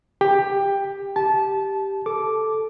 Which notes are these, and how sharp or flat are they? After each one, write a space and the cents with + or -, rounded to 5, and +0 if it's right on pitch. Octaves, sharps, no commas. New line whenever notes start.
G4 +15 G5 +15
G4 +0 A5 -20
A4 -5 D6 +0